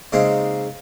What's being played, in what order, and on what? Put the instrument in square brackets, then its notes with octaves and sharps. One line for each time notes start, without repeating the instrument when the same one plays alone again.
[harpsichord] C#3 G#3 A#3 C4 D#4